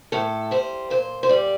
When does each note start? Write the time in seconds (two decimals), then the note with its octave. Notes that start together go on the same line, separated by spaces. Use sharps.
0.12 A2 A4
0.51 G3 C5
0.90 A#2 C5
1.23 C5
1.29 G3 D5